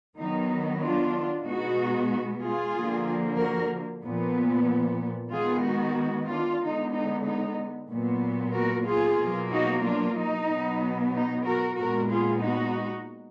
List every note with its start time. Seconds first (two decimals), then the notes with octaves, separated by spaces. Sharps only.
0.16 D#3 F#3 B3 D#4
0.80 D4 F4
1.44 B2 G#3 B3 D#4 F#4
2.41 F4 G#4
2.74 D3 F3 A#3
3.38 F#4 A#4
4.03 A#2 F3 B3
5.31 D#3 G#3 B3 F4 G#4
5.64 D#4 F#4
6.28 D4 F4
6.61 D3 G#3 B3 D#4
6.93 D#4
7.25 D#4
7.90 A#2 F#3 B3
8.54 F#4 A#4
8.86 F4 G#4
9.18 B2 F#3 A#3
9.51 D#4 F#4
9.83 D4 F4
10.15 D#4
10.48 B2 F#3 B3
11.11 D#4
11.44 F#4 A#4
11.76 A#2 G#3 B3 F#4 A#4
12.09 F4 G#4
12.41 D#4 F#4